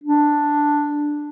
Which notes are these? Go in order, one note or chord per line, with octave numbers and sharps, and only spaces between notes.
D4